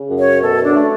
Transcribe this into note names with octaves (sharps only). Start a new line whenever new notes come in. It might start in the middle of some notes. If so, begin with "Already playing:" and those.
Already playing: C#3
F#2
C#5
B2 A4
D4
A3